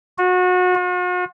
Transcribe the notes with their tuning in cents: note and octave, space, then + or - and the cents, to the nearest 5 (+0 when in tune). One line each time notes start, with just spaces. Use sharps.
F#4 -30
F#4 -45